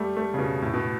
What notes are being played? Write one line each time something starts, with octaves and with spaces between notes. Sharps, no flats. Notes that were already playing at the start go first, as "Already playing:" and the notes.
Already playing: G3 A3
A3
C#3
B2
A2
B2